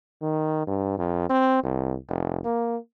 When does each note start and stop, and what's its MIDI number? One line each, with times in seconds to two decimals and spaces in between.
0.22 0.64 51
0.67 0.96 43
0.98 1.29 41
1.30 1.61 60
1.64 1.96 36
2.09 2.39 29
2.45 2.77 58